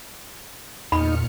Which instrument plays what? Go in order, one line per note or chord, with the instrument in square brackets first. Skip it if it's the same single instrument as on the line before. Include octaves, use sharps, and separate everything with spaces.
[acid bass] E2 [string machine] A#2 F6 C#7 [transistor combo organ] D#4 [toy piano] B5